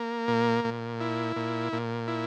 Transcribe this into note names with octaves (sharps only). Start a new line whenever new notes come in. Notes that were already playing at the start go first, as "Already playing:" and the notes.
Already playing: A#3
A#2
A#2
E4
A#2
A#2
E4